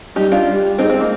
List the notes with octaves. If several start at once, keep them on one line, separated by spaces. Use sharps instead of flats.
G3 D#4 G4
D4 F4
G3
G#3 C4 D#4
C4
A#3